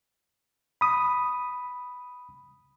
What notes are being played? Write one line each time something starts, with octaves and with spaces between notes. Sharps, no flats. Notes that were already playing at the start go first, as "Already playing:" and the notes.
B5 D#6